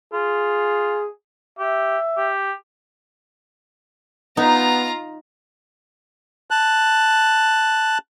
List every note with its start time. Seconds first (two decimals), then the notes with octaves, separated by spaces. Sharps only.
0.13 F4 G#4
1.59 G4 E5
2.17 G4
4.37 B3 D#4 F4 A#5
6.51 A5 F#6